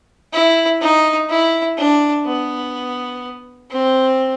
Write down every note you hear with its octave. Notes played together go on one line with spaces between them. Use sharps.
E4
D#4
E4
D4
B3
C4